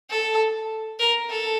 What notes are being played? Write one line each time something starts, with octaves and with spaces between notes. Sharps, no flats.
A4
A#4
A4